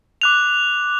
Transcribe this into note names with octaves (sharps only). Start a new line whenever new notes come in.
D6 F#6 F7